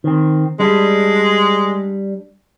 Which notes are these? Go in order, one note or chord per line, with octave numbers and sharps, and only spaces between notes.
D#3 C4
G3 G#3 D4